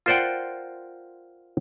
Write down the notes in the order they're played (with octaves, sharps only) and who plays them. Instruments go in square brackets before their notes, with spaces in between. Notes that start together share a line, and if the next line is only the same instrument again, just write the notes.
[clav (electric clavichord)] F4 A#4 C5 D5 F#5 G5